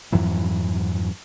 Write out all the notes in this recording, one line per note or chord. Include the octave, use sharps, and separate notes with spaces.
F2 G#2 E3 F#3